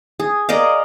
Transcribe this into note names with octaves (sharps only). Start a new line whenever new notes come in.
G#4
A#4 D5 D#5 F5